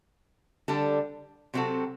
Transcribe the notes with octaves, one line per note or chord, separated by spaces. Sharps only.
D3 G3 D4 A4
C3 F#3 C4 F#4 A4